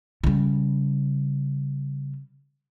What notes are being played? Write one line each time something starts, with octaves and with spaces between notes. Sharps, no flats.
C#3 G3